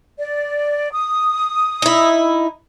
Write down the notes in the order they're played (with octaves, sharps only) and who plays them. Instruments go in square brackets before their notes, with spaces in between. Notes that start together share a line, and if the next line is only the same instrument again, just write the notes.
[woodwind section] D5
D#6
[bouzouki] D#4 E4